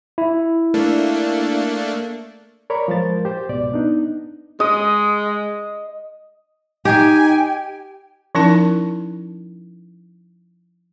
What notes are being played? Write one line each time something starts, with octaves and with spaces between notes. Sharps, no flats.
E4
A3 A#3 D4
A#4 C#5 D5 A#5 B5
F3 G#3 A#4 C5 A6
G4 C5
C#2 G#2 B2 D5
B3 D4 D#4
G#3 D#5
D#4 G4 G5 G#5
F3 C#4 D#4 E4 A#4 A5